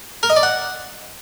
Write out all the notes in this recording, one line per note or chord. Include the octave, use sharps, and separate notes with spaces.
A#4
D#5
D5
F#5